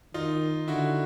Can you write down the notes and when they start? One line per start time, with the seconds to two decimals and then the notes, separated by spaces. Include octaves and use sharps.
0.14 D#3 D#4 F4
0.68 D3 E4 F#4